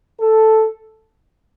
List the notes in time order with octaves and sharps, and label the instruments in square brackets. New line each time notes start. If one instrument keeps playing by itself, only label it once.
[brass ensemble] A4